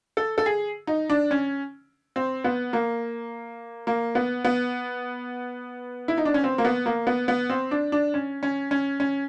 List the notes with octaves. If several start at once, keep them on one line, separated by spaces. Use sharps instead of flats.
A4
A4
G#4
D#4
D4
C#4
C4
B3
A#3
A#3
B3
B3
E4
D#4
D4
C#4
C4
A#3
B3
A#3
B3
B3
C4
D4
D4
C#4
C#4
C#4
C#4